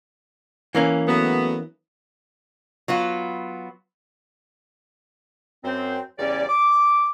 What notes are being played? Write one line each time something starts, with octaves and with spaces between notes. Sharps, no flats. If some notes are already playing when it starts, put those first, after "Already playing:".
E3 A#3 C#4
F#3 A3 B3
F#3 B3 F4
F#2 C4
E2 C#3 G3 C#4 D5
D6